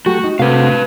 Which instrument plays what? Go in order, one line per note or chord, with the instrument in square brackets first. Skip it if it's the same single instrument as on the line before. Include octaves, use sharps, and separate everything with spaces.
[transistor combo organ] F#3 A3 G4 [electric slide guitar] F#4
[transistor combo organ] D#4
[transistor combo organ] C3 A3 F#4 [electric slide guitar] B4 F5